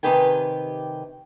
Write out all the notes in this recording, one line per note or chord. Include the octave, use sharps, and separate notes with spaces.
C3 D#3 G4 B4 G5 G#5